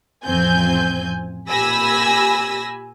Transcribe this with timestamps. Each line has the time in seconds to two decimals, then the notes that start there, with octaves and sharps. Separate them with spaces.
0.25 A1 F2 C4 G#5 G6
1.50 A#2 G4 G#5 B5 E6 A#6